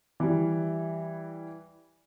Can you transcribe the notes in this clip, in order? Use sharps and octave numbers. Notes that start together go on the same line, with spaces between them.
E3 G3